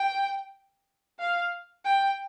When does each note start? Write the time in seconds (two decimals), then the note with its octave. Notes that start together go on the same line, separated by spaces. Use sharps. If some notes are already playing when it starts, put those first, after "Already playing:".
Already playing: G5
1.19 F5
1.85 G5